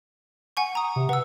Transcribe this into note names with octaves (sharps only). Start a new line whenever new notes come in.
F#5 G#5 C#6
A#5 D#6
C3
B4 F#5 E6